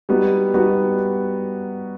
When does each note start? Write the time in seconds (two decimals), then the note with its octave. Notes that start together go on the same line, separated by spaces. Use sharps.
0.09 G3 B3 D#4 F#4
0.54 G3 B3 D#4 F#4